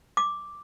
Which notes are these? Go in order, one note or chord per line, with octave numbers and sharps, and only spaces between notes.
D6